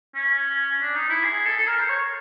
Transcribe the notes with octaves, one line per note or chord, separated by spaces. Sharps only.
C#4
D4
D#4
E4
G#4
A4
A4
A#4
C5
C#5